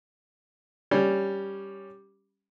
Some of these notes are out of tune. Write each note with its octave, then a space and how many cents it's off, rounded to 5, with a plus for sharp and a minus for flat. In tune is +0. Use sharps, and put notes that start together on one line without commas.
G3 +0 C#4 +0